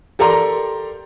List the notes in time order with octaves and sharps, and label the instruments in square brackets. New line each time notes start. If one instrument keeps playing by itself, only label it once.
[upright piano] G4 A4 A#4 D5 A#5 C6